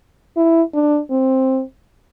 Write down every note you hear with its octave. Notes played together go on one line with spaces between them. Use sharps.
E4
D4
C4